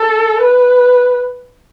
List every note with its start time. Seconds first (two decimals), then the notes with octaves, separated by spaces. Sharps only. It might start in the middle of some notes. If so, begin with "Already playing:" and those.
Already playing: A4
0.42 B4